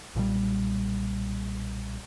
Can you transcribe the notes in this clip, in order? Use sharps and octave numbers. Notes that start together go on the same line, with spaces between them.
B1 A#2 D3 G3